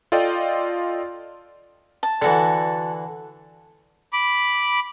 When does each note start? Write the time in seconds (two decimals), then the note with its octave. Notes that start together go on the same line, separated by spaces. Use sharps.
0.12 F4 A4 D5 D#5 G5
2.03 A5
2.22 D3 E3 F#4 A4
4.13 B5 D6